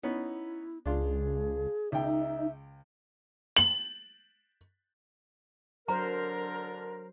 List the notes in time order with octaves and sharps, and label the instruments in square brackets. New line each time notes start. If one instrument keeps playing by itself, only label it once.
[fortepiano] B3 C#4 D#4 [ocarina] E4
[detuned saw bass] C#2 [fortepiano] D4 F4 [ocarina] G#4
[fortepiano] C#2 G5 [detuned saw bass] D#4 [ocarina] E5
[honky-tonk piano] F#7
[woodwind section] D3 D4 A#4 [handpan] F#3 C5 [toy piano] A#5